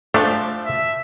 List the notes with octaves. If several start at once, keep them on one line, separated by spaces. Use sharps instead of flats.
F3 A3 D4 C5
E5